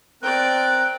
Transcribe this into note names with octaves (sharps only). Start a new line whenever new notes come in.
C4 A#4 D5 G5 F#6